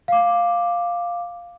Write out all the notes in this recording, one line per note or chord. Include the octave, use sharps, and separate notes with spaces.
F5 D6